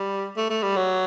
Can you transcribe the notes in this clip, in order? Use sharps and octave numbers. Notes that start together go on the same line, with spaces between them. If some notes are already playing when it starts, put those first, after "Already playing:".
Already playing: G3
A3
A3
G3
F#3